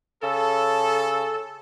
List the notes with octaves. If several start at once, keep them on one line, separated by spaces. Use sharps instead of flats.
C#3 A4